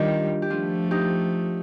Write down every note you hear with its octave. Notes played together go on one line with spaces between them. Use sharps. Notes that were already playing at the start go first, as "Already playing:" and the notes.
Already playing: D#3 G3 D4 F4 G4
G4
F3 A3 D4 F4
D#4 G4